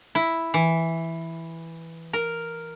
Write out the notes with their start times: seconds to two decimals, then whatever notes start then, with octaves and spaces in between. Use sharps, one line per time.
0.15 E4
0.54 E3
2.13 A#4